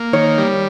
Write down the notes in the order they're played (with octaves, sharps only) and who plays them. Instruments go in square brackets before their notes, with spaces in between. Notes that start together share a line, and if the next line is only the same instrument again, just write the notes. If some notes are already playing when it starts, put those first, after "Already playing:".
Already playing: [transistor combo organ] A#3
[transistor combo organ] D#3 [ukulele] C#5
[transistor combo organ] G3